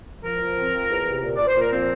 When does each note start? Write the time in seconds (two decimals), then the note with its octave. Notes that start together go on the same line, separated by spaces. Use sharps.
0.24 F3 A#4
0.41 F3
0.56 C4
0.73 F3
0.90 E2
1.06 C3
1.22 A#2
1.36 A#2 D5
1.47 C5
1.56 A#2 A#4
1.72 F3 C4